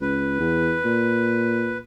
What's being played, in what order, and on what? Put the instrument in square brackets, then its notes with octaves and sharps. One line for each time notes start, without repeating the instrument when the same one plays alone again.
[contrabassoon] C#2 [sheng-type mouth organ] B4
[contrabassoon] E2
A#2